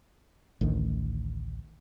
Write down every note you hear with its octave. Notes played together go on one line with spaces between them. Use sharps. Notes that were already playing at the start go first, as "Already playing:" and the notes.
A1 D2 D#3